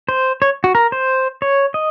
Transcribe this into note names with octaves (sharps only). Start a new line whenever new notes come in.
C5
C#5
F#4
A#4
C5
C#5
D#5